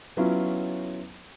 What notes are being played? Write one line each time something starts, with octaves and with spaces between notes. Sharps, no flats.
F#3 B3 C#4 E4 F4